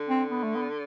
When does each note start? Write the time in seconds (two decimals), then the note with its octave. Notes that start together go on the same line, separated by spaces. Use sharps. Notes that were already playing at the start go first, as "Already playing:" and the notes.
Already playing: D3
0.09 C4
0.30 B3
0.44 A3
0.56 B3